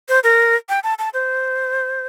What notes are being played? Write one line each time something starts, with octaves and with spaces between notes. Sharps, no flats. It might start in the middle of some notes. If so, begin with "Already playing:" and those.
C5
A#4
G5
A5
A5
C5